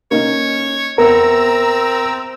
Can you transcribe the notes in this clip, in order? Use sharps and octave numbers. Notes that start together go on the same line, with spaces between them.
A#3 C#4 D#4 C#5
E2 B3 C4 A#4 A#5 E6